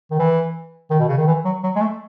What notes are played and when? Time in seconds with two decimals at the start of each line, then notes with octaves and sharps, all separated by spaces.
0.11 D#3
0.19 E3
0.90 D#3
0.99 B2
1.09 C#3
1.17 D#3
1.27 E3
1.45 F#3
1.63 F#3
1.75 G#3
1.81 A3